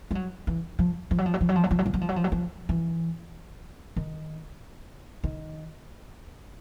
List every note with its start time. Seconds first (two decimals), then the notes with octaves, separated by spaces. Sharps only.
0.11 G3
0.15 F#3
0.47 E3
0.79 F3
1.11 F3
1.18 F#3
1.26 F3
1.34 F#3
1.41 F3
1.49 F#3
1.56 F3
1.64 F#3
1.71 F3
1.79 F#3
1.86 F3
1.94 F#3
2.01 F3
2.09 F#3
2.16 F3
2.24 F#3
2.32 F3
2.69 E3
3.96 D#3
5.24 D#3